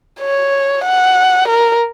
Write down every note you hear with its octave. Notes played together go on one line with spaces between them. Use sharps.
C#5
F#5
A#4